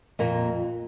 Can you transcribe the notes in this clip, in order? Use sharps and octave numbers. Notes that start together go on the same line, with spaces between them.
F2 A#2 A#3